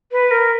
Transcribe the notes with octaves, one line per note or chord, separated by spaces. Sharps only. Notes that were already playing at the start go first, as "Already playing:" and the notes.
B4
A#4